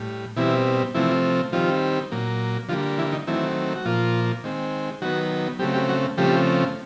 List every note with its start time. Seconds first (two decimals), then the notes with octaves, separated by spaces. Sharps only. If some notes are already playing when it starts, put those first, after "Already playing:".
Already playing: A2 G3
0.36 B2 E3 G3 C4 E4
0.95 C3 E3 F3 A3 C4 E4
1.52 D#3 F3 G3 C4 F4
2.12 A#2 F#3 A#3
2.69 D3 F3 G3 A#3 F4
2.98 E3 E4
3.12 D#3 D#4
3.27 D#3 E3 F#3 A3 C4 E4
3.76 F#4
3.85 A#2 F3 A#3 F4
4.44 D#3 G#3 C4
5.02 D#3 F#3 B3 F#4
5.59 C#3 F#3 G3 A3 C4 G4
5.74 G3 G4
5.89 F#3 F#4
6.17 C#3 F3 G3 A3 C4 G4